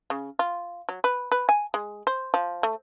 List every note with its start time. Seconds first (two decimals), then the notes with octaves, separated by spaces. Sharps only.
0.10 C#3
0.39 F4
0.89 F#3
1.04 B4
1.32 B4
1.49 G#5
1.74 G#3
2.07 C5
2.34 F3
2.63 A3